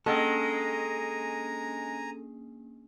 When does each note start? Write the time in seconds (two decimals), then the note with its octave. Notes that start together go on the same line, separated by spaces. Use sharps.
0.06 G#3 A#3 C#4 D4 A4 G#5 A#5